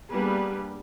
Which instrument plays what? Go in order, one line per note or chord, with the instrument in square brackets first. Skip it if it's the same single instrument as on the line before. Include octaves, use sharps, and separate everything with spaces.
[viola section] G3 A#3 B3 D4 G#4 B4